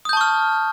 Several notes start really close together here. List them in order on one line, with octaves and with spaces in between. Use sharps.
D#6 G6 A5 C#6 F6